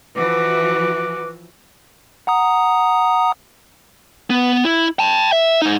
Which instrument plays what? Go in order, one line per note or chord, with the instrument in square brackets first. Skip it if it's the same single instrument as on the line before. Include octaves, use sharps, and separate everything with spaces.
[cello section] E3 F3 F#4 [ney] B4 [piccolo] D6
[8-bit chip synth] F#5 A#5 D#6
[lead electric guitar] B3
E4
G5 A5
E5
G#2 D#4